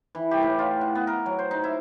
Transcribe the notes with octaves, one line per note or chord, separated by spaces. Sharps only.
E3
G4
A2
F4
F#5
B3
A#4
F#3
C5
D#4
E4